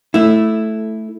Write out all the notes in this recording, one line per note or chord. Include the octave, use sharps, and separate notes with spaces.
A3 E4